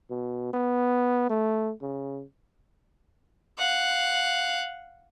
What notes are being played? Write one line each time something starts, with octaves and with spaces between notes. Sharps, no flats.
B2
B3
A3
C#3
F5 F#5